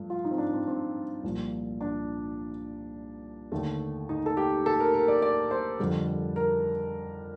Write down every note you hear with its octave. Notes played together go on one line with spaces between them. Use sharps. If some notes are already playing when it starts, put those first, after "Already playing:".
Already playing: G2 F3 A3
F4
D#4
C4
D4
C4
C4
C2 A#2 F3
D4
D#2 D3 A3
D#4
A4
G4
A4
A#4
A#4
D5
D5
C5
F2 D3 G3
A#4